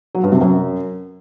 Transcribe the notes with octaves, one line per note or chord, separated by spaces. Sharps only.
F#3
G2
C3
F#2